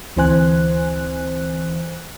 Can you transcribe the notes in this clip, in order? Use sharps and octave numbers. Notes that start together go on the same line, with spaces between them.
D2 E3 C4 C5 G#5 F#6